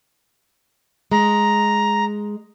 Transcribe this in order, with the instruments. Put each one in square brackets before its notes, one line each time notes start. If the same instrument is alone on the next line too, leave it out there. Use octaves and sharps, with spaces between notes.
[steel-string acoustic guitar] G#3 [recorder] A#5